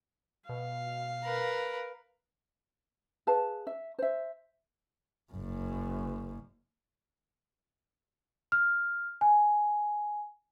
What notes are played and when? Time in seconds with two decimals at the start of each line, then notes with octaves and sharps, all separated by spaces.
0.49 B2 F5
1.24 A#4 B4
3.27 G#4 B4 F5 A5
3.67 E5
3.99 C5 E5
5.33 F#1 F#2
8.52 F6
9.21 G#5